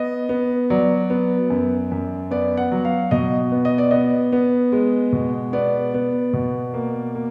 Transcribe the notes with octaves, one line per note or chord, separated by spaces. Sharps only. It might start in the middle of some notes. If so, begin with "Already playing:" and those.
Already playing: B3 D#5
B3
F#3 D5
B3
F#2
F#2
B3 D5
F#5
F#3
F5
B2 D#5
B3
D#5
D5
B3 D#5
B3
G#3
B2
B3 D5
B3
B2
A#3
A#3